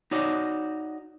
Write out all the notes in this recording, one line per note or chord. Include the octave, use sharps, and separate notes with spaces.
D#4 F#4 C#5 D5